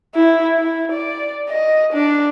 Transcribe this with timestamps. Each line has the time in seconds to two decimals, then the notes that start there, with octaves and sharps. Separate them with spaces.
0.15 E4
0.58 E4
0.92 D5
1.49 D#5
1.93 D4